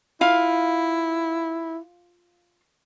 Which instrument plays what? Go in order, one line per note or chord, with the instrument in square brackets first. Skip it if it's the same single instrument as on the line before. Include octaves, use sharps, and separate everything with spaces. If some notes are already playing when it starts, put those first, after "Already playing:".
[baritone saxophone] E4 [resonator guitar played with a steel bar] F4 F5